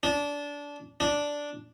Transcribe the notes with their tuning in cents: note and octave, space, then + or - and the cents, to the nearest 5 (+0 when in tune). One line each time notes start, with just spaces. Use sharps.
D4 -20
D4 -5